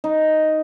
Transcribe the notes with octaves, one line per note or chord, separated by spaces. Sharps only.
D#4